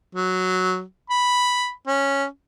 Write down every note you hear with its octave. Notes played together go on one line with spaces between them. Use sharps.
F#3
B5
C#4